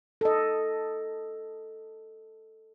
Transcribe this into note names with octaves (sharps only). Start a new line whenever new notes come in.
A4 D#5